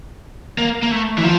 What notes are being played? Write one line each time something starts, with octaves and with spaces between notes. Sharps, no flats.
A#3
A#3
A3
E3
F3